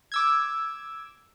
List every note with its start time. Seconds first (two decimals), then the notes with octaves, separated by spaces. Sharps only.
0.12 D6 E6 G#6